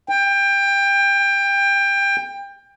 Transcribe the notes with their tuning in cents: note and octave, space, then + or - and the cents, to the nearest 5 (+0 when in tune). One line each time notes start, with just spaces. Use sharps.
G5 +20